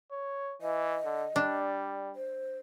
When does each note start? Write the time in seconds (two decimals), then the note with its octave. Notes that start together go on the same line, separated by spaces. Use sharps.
0.11 C#5
0.62 E3 D#5
1.05 D3
1.36 G3 D4
2.16 C5